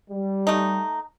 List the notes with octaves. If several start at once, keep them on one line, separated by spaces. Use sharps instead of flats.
G3
A3 D#4